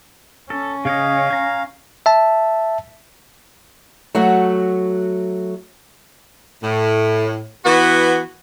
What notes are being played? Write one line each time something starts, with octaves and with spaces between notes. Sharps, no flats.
C#4 A4
C#3 C#5 D#5 F5
G#5 A#5
E5 A5
F#3 A3 F#4
A2
E3 B3 F#4